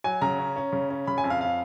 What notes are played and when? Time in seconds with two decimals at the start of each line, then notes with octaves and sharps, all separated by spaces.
0.04 F#3 G#5
0.22 C#3 A#5
0.39 C#4
0.56 C#4
0.73 C#3
0.90 C#4
1.07 C#3 B5
1.18 G#5
1.24 F2
1.30 F5
1.41 F5